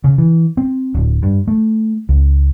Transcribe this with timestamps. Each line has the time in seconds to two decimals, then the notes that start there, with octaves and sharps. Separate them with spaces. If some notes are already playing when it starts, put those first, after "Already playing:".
0.04 C#3
0.18 E3
0.57 C4
0.94 D1
1.23 G2
1.48 A3
2.09 C#2